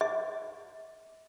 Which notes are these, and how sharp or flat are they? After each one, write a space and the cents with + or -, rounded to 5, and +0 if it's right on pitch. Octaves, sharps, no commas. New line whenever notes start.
E5 -40